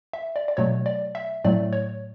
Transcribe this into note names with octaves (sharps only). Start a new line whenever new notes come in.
E5
D5
D5
B2 F#3 A3 C#5
D5
E5
A2 F#3 A3 D5
C#5